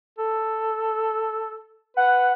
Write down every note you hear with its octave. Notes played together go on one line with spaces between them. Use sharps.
A4
B4 F#5